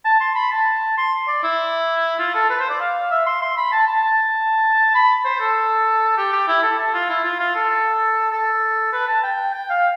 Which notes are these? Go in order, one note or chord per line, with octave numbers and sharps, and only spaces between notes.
A5
C6
B5
A5
C6
D5
E4
F4
A4
B4
C5
D5
F5
E5
C6
C6
B5
A5
A5
A5
B5
C5
A4
G4
G4
E4
A4
A4
F4
E4
F4
F4
A4
A4
B4
A5
G5
G5
F5